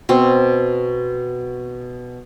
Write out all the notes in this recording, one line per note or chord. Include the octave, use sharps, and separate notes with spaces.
B2 C4